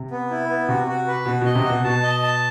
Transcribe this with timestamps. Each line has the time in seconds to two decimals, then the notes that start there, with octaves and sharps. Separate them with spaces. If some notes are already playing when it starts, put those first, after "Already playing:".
Already playing: C3
0.11 B3
0.30 E4
0.49 B3
0.69 C3 F#4
0.88 F#4
1.07 B4
1.26 B2 F#4
1.41 B2 D#5
1.55 C3
1.64 F#4
1.69 B2
1.84 B2 A5
2.03 D#5
2.22 A5